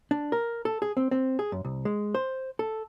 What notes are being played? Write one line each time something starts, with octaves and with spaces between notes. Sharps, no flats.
D4
A#4
A4
G#4
C4
C4
G#4
F#2
C2
G#3
C5
A4